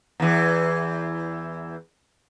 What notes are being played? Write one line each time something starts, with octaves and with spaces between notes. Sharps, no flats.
E2 E3